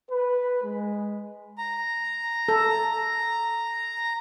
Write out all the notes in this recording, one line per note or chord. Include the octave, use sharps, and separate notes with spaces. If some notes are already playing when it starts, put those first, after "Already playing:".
B4
G#3
A#5
A4